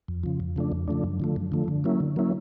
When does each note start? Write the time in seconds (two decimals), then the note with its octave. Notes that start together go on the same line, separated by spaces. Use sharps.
0.08 F2
0.23 C#3 F3
0.40 F2
0.56 C#3 F3 A3 D4
0.72 F2
0.88 C#3 F3 A3 D4
1.04 F#2
1.20 D3 F3 A3
1.36 F#2
1.52 D3 F3 A3
1.68 D3
1.84 F#3 A#3 C#4 E4
2.00 D3
2.16 F#3 A#3 C#4 E4